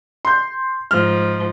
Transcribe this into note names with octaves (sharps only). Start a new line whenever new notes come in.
C6 G6
G#2 F3 F6